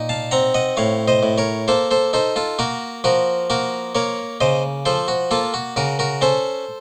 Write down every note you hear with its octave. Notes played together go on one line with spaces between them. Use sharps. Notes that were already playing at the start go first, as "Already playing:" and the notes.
Already playing: A#2 D#4
F5 A5
C4 F#5 A#5
D#5 F#5
A2 C#5 F5
C5 D#5
A2
A#4 C#5
A#3 A4 C5
A4 C5
D#4 A4 C5
F4 A4
A#3 F#4 A#4
F3 F#4 A#4
A#3 F#4 A#4
A#3 A#4 C#5
C#3 C5 D#5
F3 A4 C5
F#4
A#3 F4 A4
F#4
C#3 F#4 A#4
F#4 A#4
C#4 A4 C5